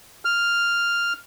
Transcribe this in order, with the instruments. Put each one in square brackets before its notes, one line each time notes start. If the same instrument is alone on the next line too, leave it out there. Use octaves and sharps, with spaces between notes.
[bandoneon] F6